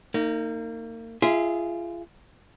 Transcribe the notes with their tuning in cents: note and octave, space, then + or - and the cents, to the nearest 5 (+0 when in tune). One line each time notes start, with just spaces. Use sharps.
A#3 -35 D#4 +0
F4 -30 G#4 +0 E5 -10